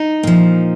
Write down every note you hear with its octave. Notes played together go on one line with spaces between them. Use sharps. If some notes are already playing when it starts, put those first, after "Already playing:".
Already playing: D#4
A#2 F3